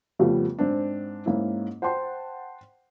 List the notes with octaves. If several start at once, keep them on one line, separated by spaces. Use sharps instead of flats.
F2 C#3 F3 G3 A3 B3
G#2 C4 D4
G#2 A#3 C#4 E4
C5 F#5 G5 A5 C6